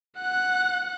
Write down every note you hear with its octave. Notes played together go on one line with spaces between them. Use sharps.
F#5 F#6